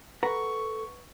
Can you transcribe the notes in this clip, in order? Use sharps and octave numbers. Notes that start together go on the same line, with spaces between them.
A4 B4 F#5 A#5 C#6